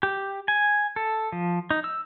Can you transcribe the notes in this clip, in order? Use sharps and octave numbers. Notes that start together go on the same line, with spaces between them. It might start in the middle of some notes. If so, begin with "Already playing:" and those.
G4
G#5
A4
F3
D#4
E6